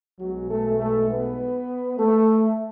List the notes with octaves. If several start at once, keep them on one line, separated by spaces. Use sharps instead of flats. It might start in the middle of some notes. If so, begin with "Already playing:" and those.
B1 B2 F#3 G#3 F#4
A3 A4
A3 A4
B3 B4
A3 A4